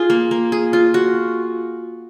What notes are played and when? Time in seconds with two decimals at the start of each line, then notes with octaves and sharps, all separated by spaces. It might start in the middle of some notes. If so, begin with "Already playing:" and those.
Already playing: F4 G#4
0.10 A#3
0.31 A#3
0.52 G#4
0.73 F4
0.94 F#4